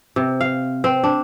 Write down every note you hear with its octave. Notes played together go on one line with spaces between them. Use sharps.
C3
F5
C4
D4